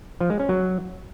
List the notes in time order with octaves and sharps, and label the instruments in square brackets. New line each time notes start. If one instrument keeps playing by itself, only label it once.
[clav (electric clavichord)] F3
G#3
C#4
F#3